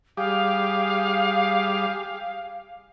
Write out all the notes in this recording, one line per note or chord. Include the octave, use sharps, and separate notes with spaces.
G3 G4 G#4 F5